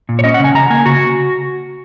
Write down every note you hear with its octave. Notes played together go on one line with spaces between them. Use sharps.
A#2
C#5
C#4 D#5
F#5
C#3
G#5
C#3 A#5
A#3 G#5
C#3 F#4